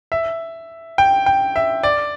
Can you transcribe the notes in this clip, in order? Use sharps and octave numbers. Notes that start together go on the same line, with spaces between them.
E5
G5
G5
E5
D5